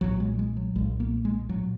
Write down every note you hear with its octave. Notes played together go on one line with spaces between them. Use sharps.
B1 A#2 F#3
G#3
G#3
F#3
B1 A#2 G#3
A#3
G#3
A#2 F#3